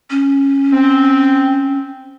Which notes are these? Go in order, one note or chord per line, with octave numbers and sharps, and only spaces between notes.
C#4
C4